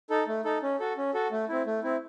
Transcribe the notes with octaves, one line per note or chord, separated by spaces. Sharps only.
D#4 A4
A3
D#4 A4
C#4
F#4 A4
C#4
F#4 A4
A3
C4 E4
A3
C4 E4